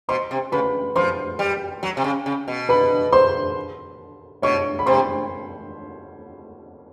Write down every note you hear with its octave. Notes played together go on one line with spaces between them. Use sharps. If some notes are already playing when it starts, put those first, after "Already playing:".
B2 C5 C6
C3
C#3 B4 B5
F3 C5 C6
G3
F#3
C3
C#3
C#3
B2
B4 B5
C5 C6
B2 C#5 C#6
B5
C3 C5 C6